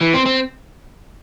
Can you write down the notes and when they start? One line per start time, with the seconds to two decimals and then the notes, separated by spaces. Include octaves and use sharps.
0.01 E3
0.14 C4
0.26 C4